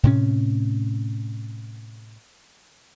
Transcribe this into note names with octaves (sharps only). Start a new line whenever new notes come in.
A2 C3 C#4